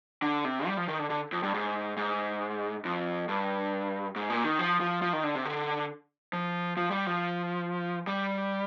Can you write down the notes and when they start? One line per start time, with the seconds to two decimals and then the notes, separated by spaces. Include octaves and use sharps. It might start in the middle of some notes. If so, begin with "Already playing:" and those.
0.22 D3
0.45 C3
0.67 G3
0.77 F3
0.88 D#3
0.99 D3
1.10 D3
1.32 F2
1.43 G2
1.54 G#2
1.97 G#2
2.85 F2
3.29 G2
4.16 G#2
4.30 A#2
4.44 D#3
4.59 F3
4.80 F3
5.02 F3
5.13 D#3
5.24 D3
5.35 C3
5.45 D3
6.33 F3
6.77 F3
6.91 G3
7.07 F3
8.07 G3